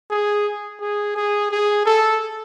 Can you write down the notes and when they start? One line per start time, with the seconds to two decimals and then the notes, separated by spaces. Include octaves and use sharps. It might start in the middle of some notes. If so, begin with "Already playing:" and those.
0.10 G#4
0.81 G#4
1.16 G#4
1.51 G#4
1.86 A4